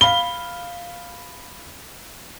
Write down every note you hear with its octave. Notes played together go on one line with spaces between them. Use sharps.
F5 B5 G7